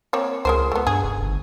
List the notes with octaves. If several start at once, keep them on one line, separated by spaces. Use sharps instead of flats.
A#3 C4 C#5
C#2 G#3 A#4 C5
A3 B3
G2 G#4
F1
G1